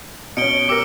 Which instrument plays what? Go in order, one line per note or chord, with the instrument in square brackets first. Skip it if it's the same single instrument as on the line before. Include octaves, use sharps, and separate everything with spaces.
[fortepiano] B2 C#4 [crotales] C#7 D7 G7
[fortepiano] G4 A#4 [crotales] D6 E6